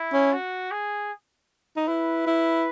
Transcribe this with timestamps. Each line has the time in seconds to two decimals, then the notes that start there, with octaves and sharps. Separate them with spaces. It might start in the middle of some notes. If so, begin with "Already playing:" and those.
Already playing: E4
0.13 C#4
0.33 F#4
0.71 G#4
1.76 D#4
1.88 E4 B4
2.27 E4